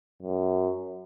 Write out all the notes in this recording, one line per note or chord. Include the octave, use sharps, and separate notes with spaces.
F#2